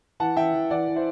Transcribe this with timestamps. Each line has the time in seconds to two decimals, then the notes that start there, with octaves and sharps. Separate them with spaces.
0.20 E3 F#5 A5
0.37 E3 E5 G5
0.54 E3
0.70 E3 D5 F#5
0.88 E3
0.96 C5 E5